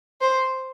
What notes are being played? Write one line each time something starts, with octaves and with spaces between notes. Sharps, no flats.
C5